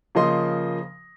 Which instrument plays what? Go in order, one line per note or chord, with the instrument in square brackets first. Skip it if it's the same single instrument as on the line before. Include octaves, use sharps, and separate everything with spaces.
[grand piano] C#3 F3 A#3 D#5 C6